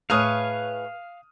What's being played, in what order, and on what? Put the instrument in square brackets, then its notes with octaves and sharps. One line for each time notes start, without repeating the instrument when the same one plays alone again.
[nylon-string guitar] A2 A5 [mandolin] G#4 B4 C#5 [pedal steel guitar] F5 [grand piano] D#6 F6